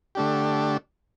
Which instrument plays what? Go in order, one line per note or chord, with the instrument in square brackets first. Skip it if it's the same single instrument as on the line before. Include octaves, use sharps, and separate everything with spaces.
[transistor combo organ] D3 A3 D4 G4